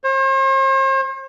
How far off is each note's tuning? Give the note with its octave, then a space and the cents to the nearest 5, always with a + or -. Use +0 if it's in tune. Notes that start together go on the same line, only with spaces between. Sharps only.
C5 +45